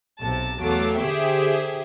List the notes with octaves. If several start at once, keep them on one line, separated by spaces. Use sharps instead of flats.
B1 C3 A5
E2 F#3 A3 F5 A5 D6
D3 G4 G#4 C5 E5 G5